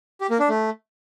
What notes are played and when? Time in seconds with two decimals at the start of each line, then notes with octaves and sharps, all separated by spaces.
0.21 G4
0.30 A#3
0.39 D4
0.49 A3